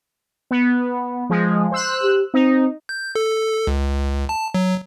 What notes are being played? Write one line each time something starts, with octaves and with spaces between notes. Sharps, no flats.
B3
F3 G#3
C5 E6 F#6
G4
C4 D#4
G6
A4
C#2
A5
F#3